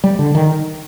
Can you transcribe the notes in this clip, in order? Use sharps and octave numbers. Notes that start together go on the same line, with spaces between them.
G3
D3
D#3